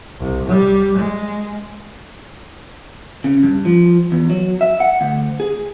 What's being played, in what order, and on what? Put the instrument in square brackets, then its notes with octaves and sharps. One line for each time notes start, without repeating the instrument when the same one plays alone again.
[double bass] C2
G3
G#3
[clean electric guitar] C#3
G2
F3
E2
F#3
E5
F#5
D2
G#4